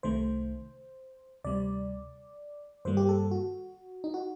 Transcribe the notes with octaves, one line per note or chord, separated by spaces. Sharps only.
C2 C3 D#3 A3 C5
D2 C3 G3 D5
G2 D#3 G3 A#3 C5
G4
A4
F#4
D#4
F#4